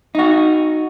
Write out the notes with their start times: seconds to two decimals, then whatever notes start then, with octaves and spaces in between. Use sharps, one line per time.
0.15 D#4 F#4